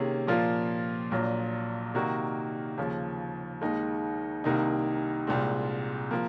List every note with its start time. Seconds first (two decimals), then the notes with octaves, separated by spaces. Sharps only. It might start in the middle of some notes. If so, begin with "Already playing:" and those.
Already playing: C3 D#3 A#3 C#4 G#4
0.27 A#2 F3 A#3 F4
1.11 A#1 A#2 F#3
1.94 C3 D#3 A#3 D#4 F#4
2.78 D#2 C#3 F3
3.61 D#2 D#3 G#3 D#4
4.44 C2 C3 D#3 A#3 D#4
5.27 C2 A#2 G#3 C4
6.11 F3 A#3